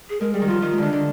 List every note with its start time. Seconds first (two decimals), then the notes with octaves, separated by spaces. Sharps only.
0.10 G#4
0.21 G#3 A#4
0.34 G3 G#4
0.41 D#3
0.47 F3 F4
0.62 D#3 F4
0.73 G#3
0.78 D3 D#3 D4
0.93 D3